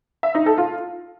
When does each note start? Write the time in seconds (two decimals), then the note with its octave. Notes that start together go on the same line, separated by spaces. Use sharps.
0.23 E5
0.35 D#4
0.46 A4
0.58 F4